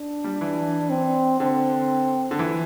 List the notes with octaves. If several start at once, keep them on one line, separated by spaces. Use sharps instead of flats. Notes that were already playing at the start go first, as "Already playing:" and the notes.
Already playing: D4
G3
E3
C4
D3 C4
D3
E3